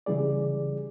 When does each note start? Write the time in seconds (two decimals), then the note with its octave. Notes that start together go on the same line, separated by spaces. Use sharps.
0.06 C#3 E3 G3 G#4 D5